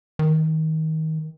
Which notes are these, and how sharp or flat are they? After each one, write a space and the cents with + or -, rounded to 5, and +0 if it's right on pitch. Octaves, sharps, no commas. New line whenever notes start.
D#3 +25